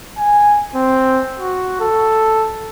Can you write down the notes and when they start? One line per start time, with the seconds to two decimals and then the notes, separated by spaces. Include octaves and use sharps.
0.18 G#5
0.75 C4
1.39 F#4
1.80 A4